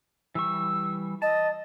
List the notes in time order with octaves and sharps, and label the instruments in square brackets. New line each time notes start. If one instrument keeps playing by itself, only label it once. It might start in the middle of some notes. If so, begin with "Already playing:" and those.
[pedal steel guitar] E3 G3 C#6 [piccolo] E6
[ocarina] D#5 [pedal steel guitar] A5 [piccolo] A6